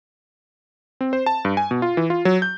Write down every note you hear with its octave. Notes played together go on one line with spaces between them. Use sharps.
C4
C5
A5
G2
G#5
B2
F4
E3
F4
F#3
G6